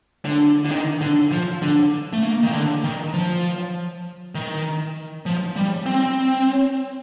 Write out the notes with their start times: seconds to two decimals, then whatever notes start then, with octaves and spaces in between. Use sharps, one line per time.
0.25 D3
0.65 D3
0.71 D#3
1.01 D3
1.32 F3
1.62 D3
2.13 A3
2.23 A#3
2.43 D#3
2.52 D3
2.84 D#3
3.14 F3
4.35 D#3
5.26 F3
5.56 G3
5.86 C4